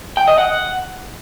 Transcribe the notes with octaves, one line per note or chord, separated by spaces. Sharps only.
G5
D#5
F#5